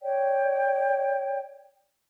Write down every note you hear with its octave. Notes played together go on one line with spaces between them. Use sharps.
C#5 D5 G5